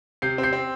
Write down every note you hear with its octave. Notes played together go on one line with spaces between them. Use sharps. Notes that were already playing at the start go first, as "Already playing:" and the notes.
C3 G6 C7
C4
G6 C7
C4